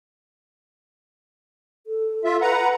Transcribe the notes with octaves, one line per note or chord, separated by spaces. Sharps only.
A4
F4 E5
B4 F#5 A#5